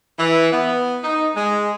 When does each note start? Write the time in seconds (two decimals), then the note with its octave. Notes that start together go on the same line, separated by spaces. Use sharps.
0.18 E3
0.52 B3
1.03 D#4
1.36 G#3